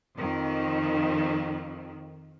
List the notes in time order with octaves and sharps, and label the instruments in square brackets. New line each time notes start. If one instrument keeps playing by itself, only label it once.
[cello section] F2 D#3